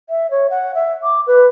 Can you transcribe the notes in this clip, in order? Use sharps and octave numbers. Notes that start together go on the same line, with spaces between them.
E5
C#5
F#5
E5
D6
B4